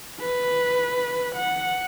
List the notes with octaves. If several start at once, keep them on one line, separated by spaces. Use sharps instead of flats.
B4
F#5